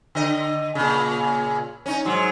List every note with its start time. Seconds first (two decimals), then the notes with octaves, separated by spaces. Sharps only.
0.15 D3 D#5
0.75 A#2 C#3
1.86 C#4 D#4
2.05 G#2 F#3